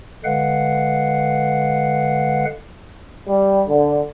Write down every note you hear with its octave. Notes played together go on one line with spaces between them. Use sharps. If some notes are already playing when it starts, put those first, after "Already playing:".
D3 G#3 B4 F5 F#5
G3
D3